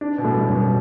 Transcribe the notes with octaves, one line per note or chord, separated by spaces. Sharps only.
D4
B2
A2
G3
F#2
B2